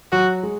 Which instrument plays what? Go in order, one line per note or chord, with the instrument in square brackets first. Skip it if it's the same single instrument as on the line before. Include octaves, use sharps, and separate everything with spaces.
[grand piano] F#3 [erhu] F#4
[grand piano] G#3